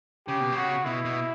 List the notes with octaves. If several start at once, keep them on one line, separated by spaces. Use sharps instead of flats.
C#3 G4
B2
C#3 F#4
B2 E4
B2